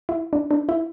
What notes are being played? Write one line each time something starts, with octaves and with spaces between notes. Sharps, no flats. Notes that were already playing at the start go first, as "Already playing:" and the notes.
E4
D4
D4
E4